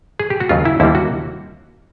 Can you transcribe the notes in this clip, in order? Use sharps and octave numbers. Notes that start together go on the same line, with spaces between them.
G#4
G4
F#4
D#2 C#3 F#3 F4
E4
D#2 D3 G3 A#3 E4
F#4